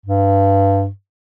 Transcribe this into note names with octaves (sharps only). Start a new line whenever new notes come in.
G2